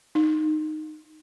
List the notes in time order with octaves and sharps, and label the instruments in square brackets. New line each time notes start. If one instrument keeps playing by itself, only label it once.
[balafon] D#4